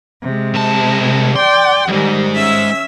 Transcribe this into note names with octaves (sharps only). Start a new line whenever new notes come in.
C3 G#3
C2 A5
D5 G5 C6
F2 G#2 D#3 G3
C#4 E5 E6